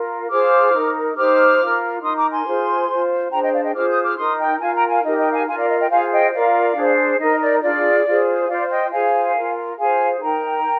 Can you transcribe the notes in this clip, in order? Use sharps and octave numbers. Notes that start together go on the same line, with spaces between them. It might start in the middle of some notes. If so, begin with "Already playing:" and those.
Already playing: F4 A#4
F4 G#4 C5 D6 F6
D#4 A#4
D#4 G4 C5 D6 F6
F4 A#4
D#4 A#4 C6 D#6
A#5 D6
G#5 C6
F4 G#4 C5
F4 C5
D4 G#4 C5 G5 A#5
D#5 G5
D5 F5
D#5 G5
F4 G#4 C5 D6 F6
D#6 G6
D6 F6
D#4 A#4 C6 D#6
D#5 G5
F4 A#4 F5 G#5
G5 A#5
F5 G#5
D#4 G4 A#4 D#5
D#5 G5
F5 G#5
F4 A#4 F5 G#5
D5 F5
D#5
D#5 G5
F4 G#4 C5 F5 G#5
D#5 G5
F4 A#4 D5 F5
D4 G#4 C5
D#4 A#4 D#5
D5
D4 F4 G#4 D5
F4 G#4 C5
F4 C5 D5 F5
D#5 G5
F4 G#4 C5 F5 G#5
F4 A#4
F4 G#4 C5 F5 G#5
D#4 A#4 G5 A#5
A#4